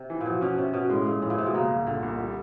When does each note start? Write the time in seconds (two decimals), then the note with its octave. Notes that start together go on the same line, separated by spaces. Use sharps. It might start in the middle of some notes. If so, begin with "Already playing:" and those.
Already playing: C3
0.10 E3
0.21 A#2
0.26 B2 F3
0.41 B2 C#4
0.58 C3 C#4
0.74 B2 C#4
0.90 A2 G#3
1.06 A#2 G#3
1.22 A2 E3
1.30 A#2
1.38 C3 G#3
1.46 B2
1.54 C#3 A#3
1.70 C2
1.87 A#2 D3
2.03 C2
2.20 G3